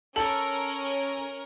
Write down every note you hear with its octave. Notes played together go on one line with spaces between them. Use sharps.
C#4 A4 A#4 F#7